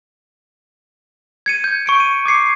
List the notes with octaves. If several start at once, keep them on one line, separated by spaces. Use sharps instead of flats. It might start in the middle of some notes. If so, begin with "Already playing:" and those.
G#6 C#7 D#7
G6
C#6 C#7 D7
D#7
D6 G#6 C7 C#7